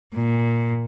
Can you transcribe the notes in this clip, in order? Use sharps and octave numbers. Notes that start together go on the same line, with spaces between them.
A#2